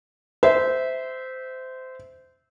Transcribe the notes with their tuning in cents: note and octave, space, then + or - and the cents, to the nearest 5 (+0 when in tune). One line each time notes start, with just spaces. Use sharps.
C5 -20 E5 -15